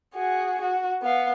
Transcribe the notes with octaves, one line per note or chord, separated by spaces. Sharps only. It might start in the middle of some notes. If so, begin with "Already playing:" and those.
F#4 G#4
F#4
B3 F5